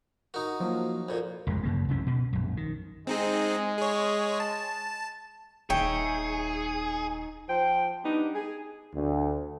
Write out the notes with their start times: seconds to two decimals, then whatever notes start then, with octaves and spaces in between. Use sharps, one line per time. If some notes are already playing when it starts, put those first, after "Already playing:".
0.34 D#4 F#4 A#4
0.60 F3 F#3 A#3
1.09 F2 A#2
1.47 A1 F2 G#3
1.63 F#2 C#3 A#3
1.89 C2 F#2 C3 C#4
2.07 B2
2.33 A#1 F#2
2.57 D#3
3.07 G#3 C4 D#4 G#4
3.78 G#4 C#5
4.40 A5
5.70 D#1 D#4 G#4 C#5 E5 G5
7.49 F3 C5 G5
8.05 G3 B3 D4 D#4 G4
8.35 G#4
8.94 D2